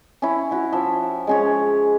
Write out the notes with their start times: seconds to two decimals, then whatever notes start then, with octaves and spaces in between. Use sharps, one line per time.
0.22 C#4 E4
0.51 E4 F#4
0.72 F3 E5
1.27 G#3 C#4 C#5